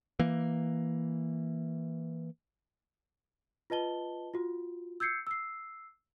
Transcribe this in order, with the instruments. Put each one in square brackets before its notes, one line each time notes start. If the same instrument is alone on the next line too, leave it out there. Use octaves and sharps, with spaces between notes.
[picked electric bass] E3 A#3
[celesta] F4 B4 D#5 A5 G7
F4 F#4
E6 G6 G#6 C7 C#7
E6 C7